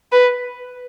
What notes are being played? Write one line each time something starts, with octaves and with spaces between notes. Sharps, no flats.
B4